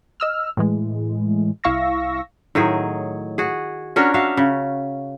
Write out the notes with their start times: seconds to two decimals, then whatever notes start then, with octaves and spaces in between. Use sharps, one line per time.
0.20 D#5 E6 F6
0.57 A2 E3 G#3
1.64 C2 E4 F5 C#6 E6 A#6
2.55 A2 D#3 F#3 G#4
3.38 F#4 G#4
3.96 C#4 D4 F#4 A#4
4.14 F#4 E5 F5
4.37 C#3